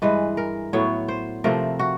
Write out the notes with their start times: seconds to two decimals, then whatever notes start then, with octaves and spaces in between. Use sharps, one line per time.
0.02 G2 E3 G#3 B4
0.37 A#4
0.73 A2 F#3 B3 C#5
1.08 C5
1.44 C3 F3 A3 C4 A#4
1.79 F#4